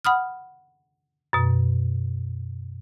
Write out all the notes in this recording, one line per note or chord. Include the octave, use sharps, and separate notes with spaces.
F#5 B5 D#6 F6
F#2 B2